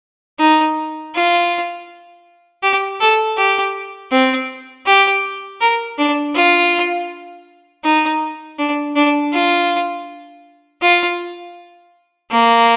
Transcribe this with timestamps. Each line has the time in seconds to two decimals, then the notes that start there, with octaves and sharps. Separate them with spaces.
0.40 D#4
1.15 F4
2.63 G4
3.01 A4
3.37 G4
4.12 C4
4.86 G4
5.61 A#4
5.98 D4
6.35 F4
7.84 D#4
8.59 D4
8.96 D4
9.33 F4
10.82 F4
12.31 A#3